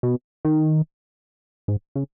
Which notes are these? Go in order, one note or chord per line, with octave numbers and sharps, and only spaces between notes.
B2
D#3
G#2
C#3